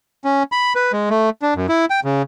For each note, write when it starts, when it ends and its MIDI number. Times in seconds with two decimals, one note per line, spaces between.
0.25 0.43 61
0.52 0.73 83
0.76 0.92 71
0.93 1.09 56
1.10 1.30 57
1.42 1.54 62
1.55 1.66 42
1.69 1.85 64
1.90 2.00 79
2.04 2.22 49